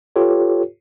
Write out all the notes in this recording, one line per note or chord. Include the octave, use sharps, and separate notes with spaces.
F4 G4 A4 B4 C#5